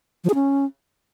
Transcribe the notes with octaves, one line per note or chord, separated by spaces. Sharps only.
F3
G#4
C#4